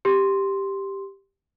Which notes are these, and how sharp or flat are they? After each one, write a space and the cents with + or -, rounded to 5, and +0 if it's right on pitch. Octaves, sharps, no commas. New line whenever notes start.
G4 +0 C6 +0